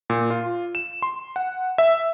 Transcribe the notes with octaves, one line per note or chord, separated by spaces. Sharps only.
A#2
F4
E7
C6
F#5
E5